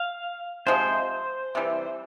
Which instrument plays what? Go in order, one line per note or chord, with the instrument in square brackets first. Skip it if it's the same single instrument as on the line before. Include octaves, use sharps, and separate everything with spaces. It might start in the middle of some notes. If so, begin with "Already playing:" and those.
Already playing: [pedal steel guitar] F5
[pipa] C3 F3 G#3 [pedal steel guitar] C5
[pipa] C3 E3 G3